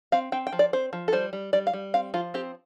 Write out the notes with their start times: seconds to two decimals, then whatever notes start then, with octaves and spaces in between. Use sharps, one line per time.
0.12 C4 F5
0.32 C4 G5
0.47 G5
0.53 F3
0.59 D5
0.73 C4 C5
0.93 F3
1.08 A4
1.13 G3 C5
1.33 G3
1.53 G3 D5
1.67 F5
1.73 G3
1.94 C4 F5
2.14 F3 F4
2.34 C4 G4